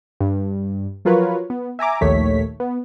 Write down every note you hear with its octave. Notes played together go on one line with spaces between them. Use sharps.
G2
F3 F#3 F4 A#4 B4 C#5
B3
E5 G#5 A#5 D6
A#1 D#2 D#3 A3 C#5 B6
B3